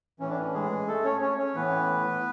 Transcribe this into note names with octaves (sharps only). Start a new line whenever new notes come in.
A2 E3 C#4
D4
C#4
G#3 G#4
A3 A4
C#4 C#5
C#4 C#5
C#4 C#5
A2 E3 B3 B4